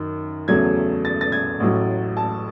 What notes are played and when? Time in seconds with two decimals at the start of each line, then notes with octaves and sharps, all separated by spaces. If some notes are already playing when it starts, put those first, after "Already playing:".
Already playing: F#2 D#3
0.48 E2 C#3 F#3 A3 G#6
1.05 A6
1.21 A6
1.32 G#6
1.60 A1 A2 F#3
2.17 A5